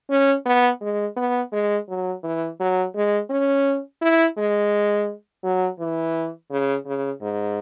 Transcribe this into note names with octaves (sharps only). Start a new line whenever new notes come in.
C#4
B3
G#3
B3
G#3
F#3
E3
F#3
G#3
C#4
E4
G#3
F#3
E3
C#3
C#3
G#2